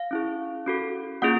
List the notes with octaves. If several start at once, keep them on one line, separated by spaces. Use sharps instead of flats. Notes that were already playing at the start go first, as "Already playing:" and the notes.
Already playing: F5
C#4 E4 G#4
C#4 F#4 A4
A#3 C#4 F4 G#4 F#5